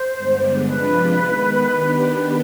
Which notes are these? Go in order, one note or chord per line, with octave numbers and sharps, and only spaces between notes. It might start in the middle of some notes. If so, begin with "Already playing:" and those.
Already playing: C5
G2 D3 G#3 B3 D4
C3 F3 G#3 D4 F4 B4
D#3 G#3 B3
D#3 B3 D4 G4